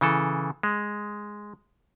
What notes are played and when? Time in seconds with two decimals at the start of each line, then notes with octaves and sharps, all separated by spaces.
0.01 C#3 E3 A4
0.63 G#3